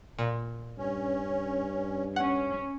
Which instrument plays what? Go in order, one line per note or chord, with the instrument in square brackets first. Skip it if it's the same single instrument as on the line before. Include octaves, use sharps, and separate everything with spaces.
[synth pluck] A#2
[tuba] G2 [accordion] C#4
[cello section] C#4 [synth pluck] F#5